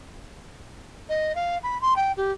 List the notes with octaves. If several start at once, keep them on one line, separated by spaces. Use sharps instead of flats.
D#5
F5
B5
C6
G5
G4